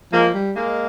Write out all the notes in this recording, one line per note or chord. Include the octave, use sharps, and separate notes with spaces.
F3 G#3 A#3
G3
G#3 A#3